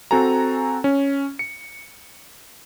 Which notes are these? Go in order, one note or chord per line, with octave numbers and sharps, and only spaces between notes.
C4 F#4 A4 G#5 A#5
C#4
C#7